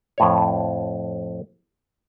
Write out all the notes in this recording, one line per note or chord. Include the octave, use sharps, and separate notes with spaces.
F2 A2 C#5